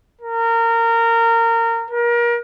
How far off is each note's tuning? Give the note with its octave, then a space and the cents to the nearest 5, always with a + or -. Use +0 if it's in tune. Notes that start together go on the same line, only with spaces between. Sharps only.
A#4 -20
A#4 +30